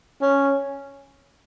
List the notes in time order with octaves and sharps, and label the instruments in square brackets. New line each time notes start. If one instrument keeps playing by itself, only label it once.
[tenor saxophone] C#4